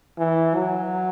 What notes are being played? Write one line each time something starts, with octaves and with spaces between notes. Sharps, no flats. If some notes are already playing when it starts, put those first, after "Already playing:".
E3
F#3